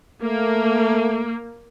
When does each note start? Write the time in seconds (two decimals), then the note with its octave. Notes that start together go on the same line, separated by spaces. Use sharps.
0.23 A3 A#3